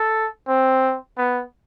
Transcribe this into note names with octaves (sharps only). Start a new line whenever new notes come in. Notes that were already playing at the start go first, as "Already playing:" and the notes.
Already playing: A4
C4
B3